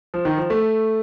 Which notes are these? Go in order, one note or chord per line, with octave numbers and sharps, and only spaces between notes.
F3
D#3
F3
A3